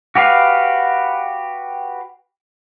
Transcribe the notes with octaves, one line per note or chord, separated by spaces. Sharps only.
F#4 G4 B4 F5